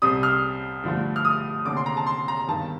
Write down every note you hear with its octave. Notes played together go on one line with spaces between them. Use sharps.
C2 C3 G3 D#6
F6
G2 D3 F3 A3
F6
D#6
F1 D#2 D3 D6
C6
A#5
A5
C6
A#5
G1 G2 D#3 A5